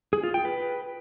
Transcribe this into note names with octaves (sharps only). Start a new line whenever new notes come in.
G#4
F4
G5
B4